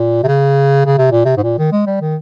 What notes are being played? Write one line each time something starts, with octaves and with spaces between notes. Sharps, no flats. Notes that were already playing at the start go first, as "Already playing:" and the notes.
Already playing: A#2
C3
C#3
C#3
C3
A#2
C3
G#2
A#2
D#3
G#3
G3
D#3